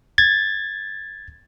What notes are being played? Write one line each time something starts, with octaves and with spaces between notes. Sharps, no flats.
G#6 A6